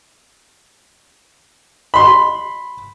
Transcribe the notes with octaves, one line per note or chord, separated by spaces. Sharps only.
B5 C6